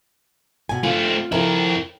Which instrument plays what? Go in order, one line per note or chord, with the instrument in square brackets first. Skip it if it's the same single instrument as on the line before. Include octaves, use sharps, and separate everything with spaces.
[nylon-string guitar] B2 G#5
[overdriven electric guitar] A3 C4 [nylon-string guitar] F4
[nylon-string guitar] F2 [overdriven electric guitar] E4 A#4